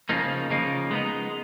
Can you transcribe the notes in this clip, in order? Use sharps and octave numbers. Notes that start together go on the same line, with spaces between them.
C#3 F3 A#3 D#4
C#3 F3 A#3 D#4
G#3 B3 D#4